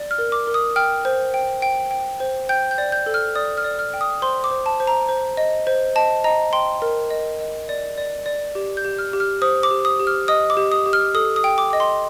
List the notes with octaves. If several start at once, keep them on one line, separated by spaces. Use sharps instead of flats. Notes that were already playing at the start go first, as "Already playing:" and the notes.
Already playing: D5
F6
A#4
D6
A#4
D#6
G5 F6
C5
G5
G5
G5
C5
G5 G6
G6
D5
G6
A4
F6
D5 D#6
F6
D5
F6
G5
D#6
C5 C6
D6
C5
A5
C5
A#5
C5
D#5
C5
D#5 A5
D#5 A#5
G5 C6
A#4
D#5
D#5
D5
D5
D5
G4
G6
G4
F6
G4
F6
C5 D#6
D6
G4
D#6
G4
F6
D#5 D#6
D6
G4
D#6
G4
F6
A4 D#6
D#6
G5
D6
D#5 D6
C6